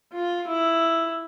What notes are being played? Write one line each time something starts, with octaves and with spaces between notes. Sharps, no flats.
F4
E4